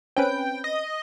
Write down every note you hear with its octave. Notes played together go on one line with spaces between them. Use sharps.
C4 C#4 B4 G5
D#5